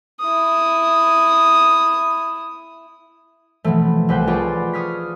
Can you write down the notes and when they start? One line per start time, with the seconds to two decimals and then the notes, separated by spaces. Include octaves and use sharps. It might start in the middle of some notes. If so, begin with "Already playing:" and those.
0.20 E4 D#6
3.64 B2 E3 F3 A3
4.09 C2 B4 C5 F#5 G5
4.27 F4 G#4 D5 A5 B5 C#6
4.73 C#6 D#6 F6 G#6 B6